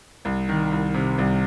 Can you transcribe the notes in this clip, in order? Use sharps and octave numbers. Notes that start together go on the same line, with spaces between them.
C2
D#3
C2
C3
C2